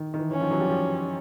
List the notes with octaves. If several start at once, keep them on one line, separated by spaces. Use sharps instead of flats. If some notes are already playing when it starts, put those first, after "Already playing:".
Already playing: D#3
D#3
E3
E3 C#4
D#3 F3
E3 F#3
F3 G3
F3 G3